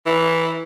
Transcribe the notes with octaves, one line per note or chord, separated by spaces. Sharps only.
E3